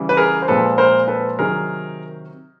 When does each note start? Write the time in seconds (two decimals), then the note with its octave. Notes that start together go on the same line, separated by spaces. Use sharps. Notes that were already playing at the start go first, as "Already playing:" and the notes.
Already playing: C#3 E3 G3
0.09 B4
0.17 G#4 A#4
0.42 C5
0.48 A#2 F3 G#3 C4 A4 B4
0.78 A#4 C5
1.08 A4 B4
1.39 C3 D#3 F#3 G#4 A#4